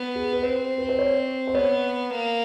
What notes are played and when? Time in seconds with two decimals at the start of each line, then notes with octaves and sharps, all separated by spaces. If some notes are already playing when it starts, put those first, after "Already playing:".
Already playing: B3
0.15 G#4
0.33 B4
0.42 C4 C5
0.78 B4
0.89 C5
0.99 C#5
1.47 C5
1.54 B3 C#5
2.10 A#3